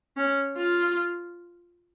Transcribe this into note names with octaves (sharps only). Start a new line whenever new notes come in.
C#4
F4